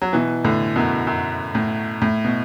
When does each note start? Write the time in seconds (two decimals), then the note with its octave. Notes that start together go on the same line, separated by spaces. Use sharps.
0.02 F#3
0.13 B2 E3
0.45 A2 D3
0.76 F#2 B2
1.07 F#2
1.55 A2
2.02 A2
2.24 B2